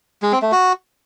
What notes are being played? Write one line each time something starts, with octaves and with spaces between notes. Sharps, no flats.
G#3
C4
A3
F#4